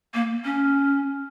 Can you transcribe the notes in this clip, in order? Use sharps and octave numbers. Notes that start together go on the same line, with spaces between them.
A#3
C#4